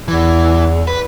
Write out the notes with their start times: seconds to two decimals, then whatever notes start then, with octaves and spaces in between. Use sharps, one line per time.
0.08 E2 E3
0.87 B4